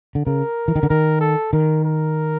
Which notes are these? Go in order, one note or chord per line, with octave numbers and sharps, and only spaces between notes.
D3
C#3 A#4
E3
D#3
D3
D#3 A#4
A4
D#3 A#4
A#4